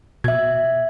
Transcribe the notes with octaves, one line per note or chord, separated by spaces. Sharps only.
B2 E5 G#6